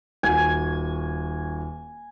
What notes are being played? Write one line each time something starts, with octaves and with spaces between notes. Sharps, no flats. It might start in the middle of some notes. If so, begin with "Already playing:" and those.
D#1 F#4 G#5